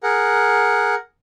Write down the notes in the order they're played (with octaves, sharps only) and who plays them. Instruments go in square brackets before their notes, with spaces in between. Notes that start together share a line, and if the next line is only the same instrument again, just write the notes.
[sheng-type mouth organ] G#4 A#4 F#5